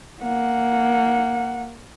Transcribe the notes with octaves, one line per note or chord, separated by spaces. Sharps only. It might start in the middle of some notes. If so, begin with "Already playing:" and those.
A#3 F#5